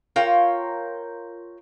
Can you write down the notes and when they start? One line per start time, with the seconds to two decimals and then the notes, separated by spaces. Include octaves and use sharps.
0.16 F4 A#4 C#5 G5